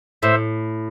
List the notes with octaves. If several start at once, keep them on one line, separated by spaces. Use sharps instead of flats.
A2 C5 E5